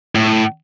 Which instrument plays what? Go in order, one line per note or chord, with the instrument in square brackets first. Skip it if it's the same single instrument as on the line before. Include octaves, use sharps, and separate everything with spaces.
[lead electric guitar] A2